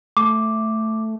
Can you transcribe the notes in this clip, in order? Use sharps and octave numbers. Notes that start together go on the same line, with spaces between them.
A3 D6